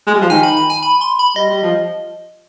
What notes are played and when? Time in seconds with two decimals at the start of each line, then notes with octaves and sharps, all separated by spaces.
0.07 G#3
0.14 G3
0.21 F3
0.30 D#3 G#5
0.43 B5
0.57 B5
0.70 G#5
0.83 B5
1.01 C6
1.19 B5
1.36 G3 D#5
1.50 G3
1.62 F3